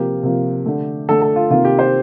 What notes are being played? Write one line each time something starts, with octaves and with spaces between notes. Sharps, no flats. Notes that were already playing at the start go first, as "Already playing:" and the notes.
Already playing: C3 F3 A#3 G4
C3 F3 A#3
D3 A3
D3 A3 A4
A4
F4
C3 D#3 A#3 F4
G4
C5